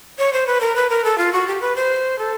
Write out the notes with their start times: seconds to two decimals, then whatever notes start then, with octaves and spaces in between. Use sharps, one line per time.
0.19 C#5
0.33 C5
0.47 B4
0.61 A#4
0.76 B4
0.90 A#4
1.04 A4
1.18 F4
1.33 F#4
1.47 G4
1.61 B4
1.76 C5
2.19 A4